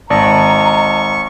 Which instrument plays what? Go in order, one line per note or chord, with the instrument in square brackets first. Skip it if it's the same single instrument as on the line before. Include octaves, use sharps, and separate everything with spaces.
[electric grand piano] G#1 D5 A5 [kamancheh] D#5 A#5 [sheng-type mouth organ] C#6